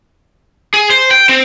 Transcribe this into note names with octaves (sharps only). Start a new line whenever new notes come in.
G#4
C5
G5
C4